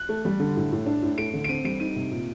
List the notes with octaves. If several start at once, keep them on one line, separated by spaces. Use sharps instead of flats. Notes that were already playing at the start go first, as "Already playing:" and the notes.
Already playing: F#6
A3
G3
D3
A2
A2
D4
A2
A3 D7
D3
D7
C4 D#7
G3 D7
D#4 D#7
C3
A#2